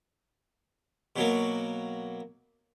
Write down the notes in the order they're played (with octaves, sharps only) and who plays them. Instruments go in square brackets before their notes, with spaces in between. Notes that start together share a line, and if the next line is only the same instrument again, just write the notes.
[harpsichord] B2 F#3 A#3